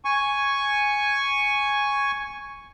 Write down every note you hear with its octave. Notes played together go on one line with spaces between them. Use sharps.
G#5 C#6